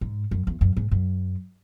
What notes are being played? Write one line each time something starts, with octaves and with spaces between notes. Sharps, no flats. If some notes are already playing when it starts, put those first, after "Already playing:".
G#2
F#2
E2
F#2
G#2
F#2